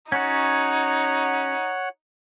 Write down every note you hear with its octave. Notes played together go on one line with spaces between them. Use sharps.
C#4 D#4 F#4 C#5 F#5